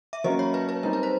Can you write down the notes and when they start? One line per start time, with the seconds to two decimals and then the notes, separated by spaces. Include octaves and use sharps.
0.13 E5
0.24 F#3 A#3 C#4 D#5
0.39 C#5
0.54 B4
0.69 B4
0.83 G3 C4 D#4 A#4
0.93 B4
1.03 C5